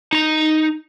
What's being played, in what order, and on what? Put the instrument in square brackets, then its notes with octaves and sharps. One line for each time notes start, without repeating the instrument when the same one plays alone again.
[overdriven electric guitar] D#4 A#5